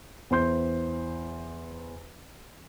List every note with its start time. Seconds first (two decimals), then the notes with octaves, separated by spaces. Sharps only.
0.30 E2 E3 C5 C6 G6